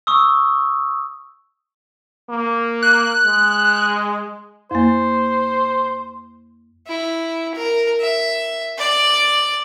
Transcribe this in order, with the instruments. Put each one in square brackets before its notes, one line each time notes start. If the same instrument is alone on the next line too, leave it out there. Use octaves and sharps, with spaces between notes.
[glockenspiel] C#6 D#6 E6
[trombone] A#3
[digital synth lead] F#6
[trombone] G#3
[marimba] F2 A#3 [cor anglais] C5
[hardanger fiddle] E4
A#4
E5
D5